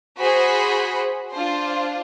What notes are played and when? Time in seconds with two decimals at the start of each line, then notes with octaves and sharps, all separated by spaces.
0.19 F#4 G#4 C5 B5
1.32 D4 F4 C5